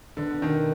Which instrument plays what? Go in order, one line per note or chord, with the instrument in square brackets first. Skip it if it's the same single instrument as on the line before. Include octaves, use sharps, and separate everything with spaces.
[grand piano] D3 [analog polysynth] B3
[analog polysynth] B2
[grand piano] D#3
[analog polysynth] B2